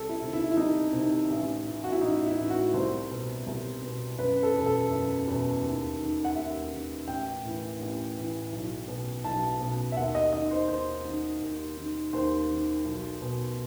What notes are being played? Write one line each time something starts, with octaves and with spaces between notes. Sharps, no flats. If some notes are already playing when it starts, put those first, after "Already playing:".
Already playing: C2 A4
E4
C3 D#3
E4
E4
C2 D#4
C3 D#3
A1
A2 E3
F#4
E4
A1 D#4
E4
A2 E3
F#4
C2 C5
B2
C2
B2
F#1 B4
A4
E2 B2
A4
F#1
E2 B2
D#2
D#3
F#5
D#2 E5
D#3
A1 G5
A2 E3
A1
A2 E3
B1
B2
B1 A5
B2
E5
D#2 F#5
D#5
D#3 D#5
C5
D#2 C5
D#3
D#2
D#3
D#2 C5
D#3
B1
B2